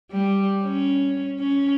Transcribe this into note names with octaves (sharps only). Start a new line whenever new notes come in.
G3
C#4
C#4